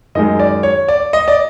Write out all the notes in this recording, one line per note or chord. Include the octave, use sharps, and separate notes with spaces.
F#2 D#3 G#3 D#5
D5
C#5
D5
D#5
D5